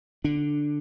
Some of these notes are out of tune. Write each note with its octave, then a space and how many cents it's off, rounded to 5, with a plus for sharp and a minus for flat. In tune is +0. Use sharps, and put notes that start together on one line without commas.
D3 +0 D4 +5